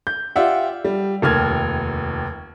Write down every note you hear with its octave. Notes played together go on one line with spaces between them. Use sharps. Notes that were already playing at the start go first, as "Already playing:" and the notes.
G6
F4 G4 D5 E5 F#5
G3
F1 D#2 F6 G#6